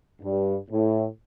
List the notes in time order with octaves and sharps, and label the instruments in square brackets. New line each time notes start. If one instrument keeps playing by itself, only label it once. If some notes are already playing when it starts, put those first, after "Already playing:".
[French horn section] G2
A2